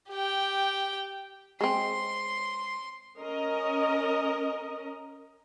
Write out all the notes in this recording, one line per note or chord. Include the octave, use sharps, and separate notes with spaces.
G4 G5
G#3 C4 C6
C#4 A#4 D#5